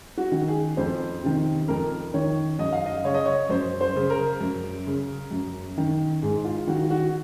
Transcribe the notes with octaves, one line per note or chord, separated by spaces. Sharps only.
F#4
D#3
G#4
F2 C5
C3 D#3
F2 A#4
D#3 C#5
F#2 D#5
F5
D#5
C#3 C#5
D#5
C#5
F#2 C5
C5
C#3
A#4
F#2
C#3
F#2
D#3
G#2 G#4
F4
D#3 F#4
F#4